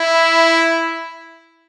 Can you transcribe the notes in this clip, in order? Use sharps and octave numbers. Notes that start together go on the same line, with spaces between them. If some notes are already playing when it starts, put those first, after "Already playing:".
Already playing: E4